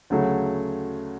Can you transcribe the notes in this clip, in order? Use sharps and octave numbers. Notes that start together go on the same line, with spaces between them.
D2 C#3 F#3 A3